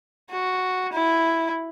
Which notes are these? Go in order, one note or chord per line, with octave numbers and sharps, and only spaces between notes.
F#4
E4